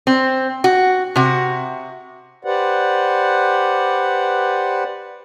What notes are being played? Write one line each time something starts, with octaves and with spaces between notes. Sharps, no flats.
C4
F#4
C3 F#4
G4 B4 C5 D5 F#5